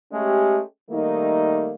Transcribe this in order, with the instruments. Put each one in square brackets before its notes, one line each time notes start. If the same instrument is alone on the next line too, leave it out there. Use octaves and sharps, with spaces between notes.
[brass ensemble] G#3 A3 C#4 G4
D#3 G3 A3 A#3 D#4